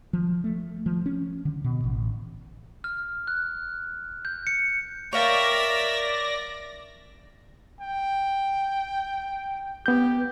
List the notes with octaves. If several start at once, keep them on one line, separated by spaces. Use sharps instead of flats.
F3
A3
F3
C#4
D3
B2
A1
F6
F#6
G6
C#7
A#4 C#5 D5 E5 F5 G5 A#6
G5
B3 G4 G6